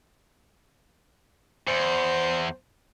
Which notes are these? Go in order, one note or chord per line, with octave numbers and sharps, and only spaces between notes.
E2 C5